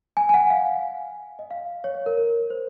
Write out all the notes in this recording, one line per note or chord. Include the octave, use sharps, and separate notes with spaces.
G#5
G#5
F#5
F5
D#5
F5
C#5
C#5
A#4
A#4
C5